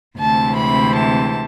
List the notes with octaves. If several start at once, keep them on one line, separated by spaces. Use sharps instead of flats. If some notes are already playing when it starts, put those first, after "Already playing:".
D2 C3 E3 G#3 C4 A5
B5
A5